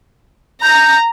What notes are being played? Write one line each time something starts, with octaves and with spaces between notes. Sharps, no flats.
A#5 G6